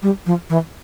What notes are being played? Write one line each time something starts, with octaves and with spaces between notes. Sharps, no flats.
G3
F3
E3